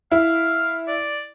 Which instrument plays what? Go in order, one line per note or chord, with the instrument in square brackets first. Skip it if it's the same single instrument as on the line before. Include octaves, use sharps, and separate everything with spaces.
[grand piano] E4 [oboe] F5
[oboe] D5